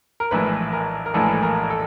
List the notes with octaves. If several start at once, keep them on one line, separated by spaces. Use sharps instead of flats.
A#4
A#1 A2 E3 G#3 B4
A#4
A#4
A#1 A2 E3 G#3 A4
A4
A#4
A4